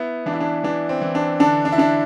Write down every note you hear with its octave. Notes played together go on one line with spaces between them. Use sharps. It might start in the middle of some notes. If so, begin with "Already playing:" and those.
Already playing: B3 E4
E3 D4
E4
D4
E3 D4
C4
E3
D4
D3 D4
D4
E4
D3 D4